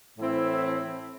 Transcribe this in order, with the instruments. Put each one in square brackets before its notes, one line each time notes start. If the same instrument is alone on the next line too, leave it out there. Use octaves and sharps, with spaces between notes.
[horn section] A2 E3 C4 E4